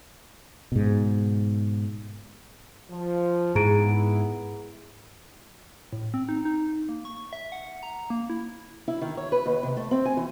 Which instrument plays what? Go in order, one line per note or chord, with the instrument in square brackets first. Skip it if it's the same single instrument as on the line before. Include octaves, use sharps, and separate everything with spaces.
[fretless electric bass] G#2 B2
[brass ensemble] F3
[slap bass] G#2 [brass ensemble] B3 E4 [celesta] G#4 A#5 D7
[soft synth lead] A2
C4
D#4
D#4
A#3
C#6
E5
F#5
A#5
A#3
E4
[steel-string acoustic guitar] E4
D#3
C#5
B4
D#2
C3
A3
C4
G#5
E3